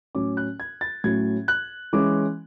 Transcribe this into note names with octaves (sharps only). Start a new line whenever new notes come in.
A2 F#3 C#4 D6
F#6
G#6
A6
A2 F#3 C#4 G#6
F#6
E3 G#3 C#4 D6